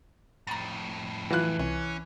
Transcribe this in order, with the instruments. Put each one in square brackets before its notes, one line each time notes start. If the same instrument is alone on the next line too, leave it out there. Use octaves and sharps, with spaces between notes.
[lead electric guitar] F2 A2 [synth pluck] A#5 A6
[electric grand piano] E3 F#6 [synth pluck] F#3 F4
[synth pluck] C2 [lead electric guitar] C#4